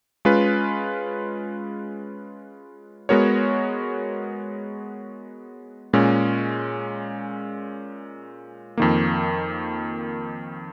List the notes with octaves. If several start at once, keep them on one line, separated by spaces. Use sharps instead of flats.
G#3 C#4 F4 B4
G#3 B3 F#4 A#4 C#5
A#2 G#3 C#4
F2 D#3 A#3